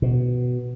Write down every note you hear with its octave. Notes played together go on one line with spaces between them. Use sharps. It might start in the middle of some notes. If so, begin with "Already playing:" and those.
B2